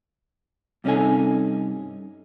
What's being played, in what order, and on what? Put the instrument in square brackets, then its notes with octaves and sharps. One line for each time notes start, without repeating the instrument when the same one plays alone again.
[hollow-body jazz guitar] G2 C3 C#4 D#4 A4 G#5